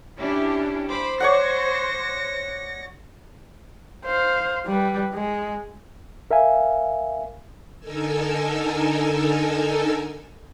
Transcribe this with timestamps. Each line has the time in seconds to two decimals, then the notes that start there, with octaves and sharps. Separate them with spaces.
0.19 C#4 D4 E4 G4
0.90 C5 B5 D6
1.20 C#5 D5 F#5 A#6 C#7
4.05 C5 F5
4.66 G3 B4
5.14 G#3
6.31 A#4 E5 F5 G#5
7.79 D3 D#4 A4 A#4 G#5 E6